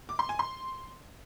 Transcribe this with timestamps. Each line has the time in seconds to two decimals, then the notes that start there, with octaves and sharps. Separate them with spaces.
0.09 D6
0.19 C6
0.29 G#5
0.39 C6